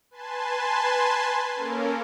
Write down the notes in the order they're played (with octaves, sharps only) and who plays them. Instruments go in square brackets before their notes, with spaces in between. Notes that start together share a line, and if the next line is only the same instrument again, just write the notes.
[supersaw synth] B4 G#5 A5 C6
A#3 C#4 A4 A#4